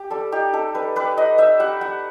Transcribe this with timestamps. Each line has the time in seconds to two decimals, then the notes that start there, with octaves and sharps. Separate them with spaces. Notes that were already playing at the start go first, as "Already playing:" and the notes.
Already playing: G4
0.10 G3 A4
0.32 D#4 G4
0.53 D#4 A4
0.74 G3 B4
0.96 G3 B4
1.17 D#4 D#5
1.38 D#4 E5
1.60 G3 F#5
1.81 G3 F#5